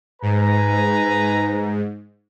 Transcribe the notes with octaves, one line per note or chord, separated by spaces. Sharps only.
G#2 B4 G#5 A#5